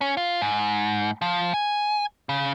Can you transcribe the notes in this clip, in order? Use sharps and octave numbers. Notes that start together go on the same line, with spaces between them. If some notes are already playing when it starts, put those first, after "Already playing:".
C#4
F4
G#2
F3
G#5
C#3